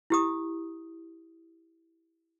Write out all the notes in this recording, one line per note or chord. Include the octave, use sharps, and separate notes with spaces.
E4 G4 D#6